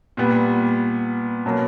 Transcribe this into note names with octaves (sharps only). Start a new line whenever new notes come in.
A#2 G3 B3
B2 F#3 A#3